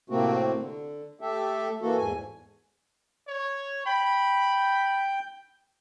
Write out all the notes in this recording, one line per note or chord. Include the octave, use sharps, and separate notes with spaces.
A2 C3 A3 A#3 C4 F#4
D3
A3 G4 A4 E5
E3 A#3 F#4 A4
E2 G#2 G#5
C#5
G5 B5